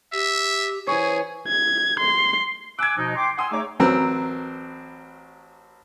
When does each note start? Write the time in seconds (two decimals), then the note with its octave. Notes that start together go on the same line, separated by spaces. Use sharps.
0.12 G4 E5
0.87 E3 G#4 B4 C#5 G#5
1.48 G#6
2.00 C6
2.79 G#5 D6 E6 F#6 G#6
2.96 B2 F3 D#4
3.15 G5 C6 D6
3.38 F#5 G#5 C6 D#6 E6
3.51 A3 D#4 G#4 C#5 D6
3.79 A1 F#3 C4 A#4 B4 E6